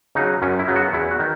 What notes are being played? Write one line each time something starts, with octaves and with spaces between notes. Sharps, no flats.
C#3 F#3 D#4
F#2 C#4
E4
C#3 F#3 B3
F#4
E2 E4
F#4
D#3